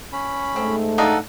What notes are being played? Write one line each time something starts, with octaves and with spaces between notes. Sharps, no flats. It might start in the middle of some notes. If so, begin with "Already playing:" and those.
C#4 B5
G#2 A3 C4
D4 D#4 A4 D#5 F5 F#5